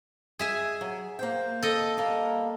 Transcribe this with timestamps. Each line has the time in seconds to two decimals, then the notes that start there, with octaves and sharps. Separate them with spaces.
0.39 G#4 E5 G#5
0.81 F#3
1.19 A#3 C5 G5
1.63 A4 D#5
1.97 G3 A#3 A#4